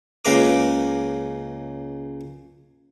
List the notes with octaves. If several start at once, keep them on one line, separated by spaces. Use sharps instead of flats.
C#2 C#3 A#3 B4 A#5 D6